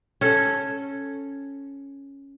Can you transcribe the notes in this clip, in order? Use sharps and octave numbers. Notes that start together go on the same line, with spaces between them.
C#4 A4